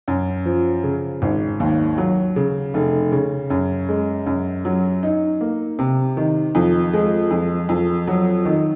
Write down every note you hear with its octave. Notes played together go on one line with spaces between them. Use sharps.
F#2
F3
C#3
G#1
D#2
F#3
C#3
F1
C#3
F#2
G#3
F#2
F#3
D#4
A#3
C3
D#3
F2
G#3
F2
F2
F#3
D#3